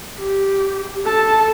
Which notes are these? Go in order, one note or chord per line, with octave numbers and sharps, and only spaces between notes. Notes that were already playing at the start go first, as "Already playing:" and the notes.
G4
A4 A5